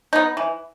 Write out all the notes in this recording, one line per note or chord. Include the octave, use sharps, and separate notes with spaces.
B3 D#4
E3